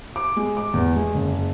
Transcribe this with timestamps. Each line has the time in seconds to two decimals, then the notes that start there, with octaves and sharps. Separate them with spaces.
0.16 D6
0.37 G#3
0.57 D6
0.74 E2
0.96 G#3
1.14 F#1